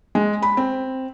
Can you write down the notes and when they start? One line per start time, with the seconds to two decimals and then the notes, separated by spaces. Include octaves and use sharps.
0.15 G#3
0.42 B5
0.57 C4